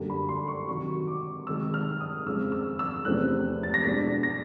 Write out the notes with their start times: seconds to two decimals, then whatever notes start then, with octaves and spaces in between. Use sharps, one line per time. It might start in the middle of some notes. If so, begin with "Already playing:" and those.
Already playing: F#2 D3 G3 A#3 D4
0.10 B5
0.29 C6
0.48 C#6
0.68 C3 D#3 F#3 C#6
1.07 D6
1.47 C3 D#3 G#3 E6
1.74 F6
2.00 D#6
2.26 F2 C#3 F3 G#3 E6
2.52 E6
2.79 E6
3.05 E2 C3 F3 A3 C#4 F#6
3.63 A6
3.74 A#6
3.84 B2 G#3 B3 D4 B6
4.23 A#6